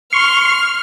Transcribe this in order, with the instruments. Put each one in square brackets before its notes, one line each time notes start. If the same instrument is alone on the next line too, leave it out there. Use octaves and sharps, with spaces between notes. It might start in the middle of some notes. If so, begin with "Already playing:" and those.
[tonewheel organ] C6 C#6 [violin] F6